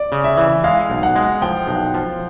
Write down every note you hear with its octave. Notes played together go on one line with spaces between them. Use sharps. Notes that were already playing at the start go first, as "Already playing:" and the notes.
Already playing: D5
C#3
E5
E3
G#3 F5
B1
F#5
G#3
F3 G5
B1
F3